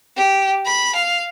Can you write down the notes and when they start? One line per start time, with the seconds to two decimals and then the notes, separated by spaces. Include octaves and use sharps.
0.16 G4
0.65 B5
0.95 F5